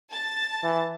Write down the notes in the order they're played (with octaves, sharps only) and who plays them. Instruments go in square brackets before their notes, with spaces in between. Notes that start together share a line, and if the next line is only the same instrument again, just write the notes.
[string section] A5 A6
[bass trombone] E3